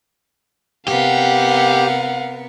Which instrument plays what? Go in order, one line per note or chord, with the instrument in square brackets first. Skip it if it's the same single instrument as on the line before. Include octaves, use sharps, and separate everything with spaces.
[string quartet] C3 B3 A#4 [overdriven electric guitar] G4 [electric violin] F5 F#5